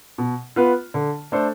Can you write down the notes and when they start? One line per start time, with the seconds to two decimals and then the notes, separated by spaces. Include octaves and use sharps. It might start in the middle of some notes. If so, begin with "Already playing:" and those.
0.18 B2
0.56 B3 F4 B4
0.94 D3
1.32 A3 D4 A4 C5